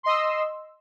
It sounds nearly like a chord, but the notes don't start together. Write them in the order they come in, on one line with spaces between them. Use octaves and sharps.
C6 D#5 E6